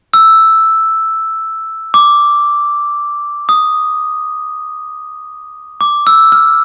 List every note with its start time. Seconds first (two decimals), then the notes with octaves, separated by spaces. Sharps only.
0.14 E6
1.94 D6
3.49 D#6
5.81 D6
6.07 E6
6.32 F6